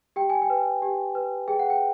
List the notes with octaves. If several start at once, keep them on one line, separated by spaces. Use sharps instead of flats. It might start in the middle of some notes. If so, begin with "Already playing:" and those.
G4 G5
G#5
G5
B4
G4
B4
G#4 G5
F#5
G5